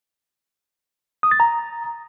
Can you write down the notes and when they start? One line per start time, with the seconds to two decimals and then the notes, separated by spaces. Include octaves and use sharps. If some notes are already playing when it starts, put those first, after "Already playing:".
1.23 D#6
1.31 A6
1.40 A#5